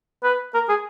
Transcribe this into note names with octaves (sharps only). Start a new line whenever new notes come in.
B4
A#4
G#4